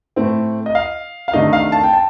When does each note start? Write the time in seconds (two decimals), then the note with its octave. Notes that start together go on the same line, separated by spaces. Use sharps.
0.16 A2 A3 C4
0.66 D#5
0.75 F5
1.28 F5
1.33 C3 D#3 A3 D4 D#5
1.53 F5
1.72 A5
1.83 G5
1.93 A5